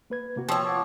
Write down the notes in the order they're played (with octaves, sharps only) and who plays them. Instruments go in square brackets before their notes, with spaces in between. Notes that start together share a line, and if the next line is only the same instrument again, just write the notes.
[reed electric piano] A#3 B4 G#6
C3 A#3 F#4
[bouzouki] F3 C#5 [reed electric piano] G5 C#6 E6
[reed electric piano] F#5 C#6 D6